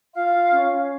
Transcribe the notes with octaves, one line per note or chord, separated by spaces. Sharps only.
F4 F5
C#4